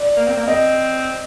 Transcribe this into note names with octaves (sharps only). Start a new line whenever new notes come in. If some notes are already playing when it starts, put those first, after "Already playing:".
Already playing: D5
A#3
C4
A#3
C4 D#5